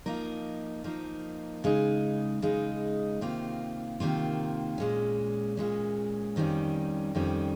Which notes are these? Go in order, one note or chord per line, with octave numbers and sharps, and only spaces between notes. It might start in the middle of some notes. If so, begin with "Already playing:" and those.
F3 A#3 D#4 A#4
F3 A#3 D#4 A#4
C#3 G#3 D#4
C#3 G#3 D#4
C3 D#3 A#3 F4
C3 D#3 A#3 F4
A#2 G#3 C#4
A#2 G#3 C#4
F2 D#3 G3 C#4
F2 D#3 G3 C#4